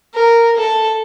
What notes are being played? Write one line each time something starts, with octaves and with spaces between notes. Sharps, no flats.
A#4
A4